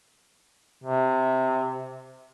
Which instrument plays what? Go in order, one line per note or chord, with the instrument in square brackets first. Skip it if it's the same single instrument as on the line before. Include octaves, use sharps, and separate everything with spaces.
[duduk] C3